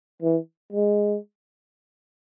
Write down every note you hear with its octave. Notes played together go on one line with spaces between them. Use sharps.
E3
G#3